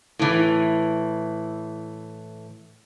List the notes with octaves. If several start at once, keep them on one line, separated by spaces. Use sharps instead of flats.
A2 E3